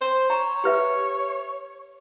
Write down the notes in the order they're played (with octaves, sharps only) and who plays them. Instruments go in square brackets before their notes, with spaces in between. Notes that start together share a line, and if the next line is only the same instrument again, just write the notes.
[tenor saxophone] C5
[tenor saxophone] C#5 [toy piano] A#5
[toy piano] G4 B4 E5